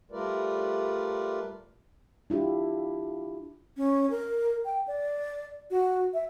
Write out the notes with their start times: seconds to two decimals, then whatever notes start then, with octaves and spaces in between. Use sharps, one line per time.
0.11 G3 A3 F4 A#4 B4 D5
2.30 D4 E4 F4 G4
3.77 C#4
4.10 A#4
4.65 G5
4.88 D5
5.71 F#4
6.14 E5